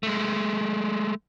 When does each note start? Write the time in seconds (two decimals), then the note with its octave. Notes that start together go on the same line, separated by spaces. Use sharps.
0.03 G#3 A3